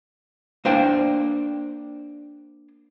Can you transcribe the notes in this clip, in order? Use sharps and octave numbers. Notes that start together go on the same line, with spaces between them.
A#3 D4 C5 D5 G5